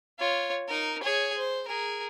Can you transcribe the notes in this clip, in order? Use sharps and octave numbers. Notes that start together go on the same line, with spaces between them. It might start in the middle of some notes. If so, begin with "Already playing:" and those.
F4 C#5
D#4 A#4
G#4 C#5
C5
G#4 A#4